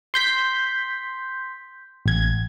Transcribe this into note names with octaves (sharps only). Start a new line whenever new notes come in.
C6 G6 B6
A1 G#6